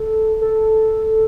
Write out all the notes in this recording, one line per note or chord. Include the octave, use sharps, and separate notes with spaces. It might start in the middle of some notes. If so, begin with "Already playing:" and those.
Already playing: A4
A4